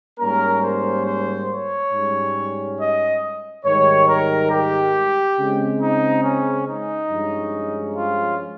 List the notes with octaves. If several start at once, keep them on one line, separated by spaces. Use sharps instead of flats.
G#2 G3 A#3 C#4 A#4
C5
C5
C#5
G#2 G3 C#4
D#5
G#2 D#3 G3 C#5
A#4
G4
C#3 G#3 C4
D#4
C#4
D#4
G2 F3 G#3 C#4
F4